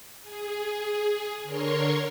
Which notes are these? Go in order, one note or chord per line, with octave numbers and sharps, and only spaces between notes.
G#4
D3 A#4 C#5 C6 C#6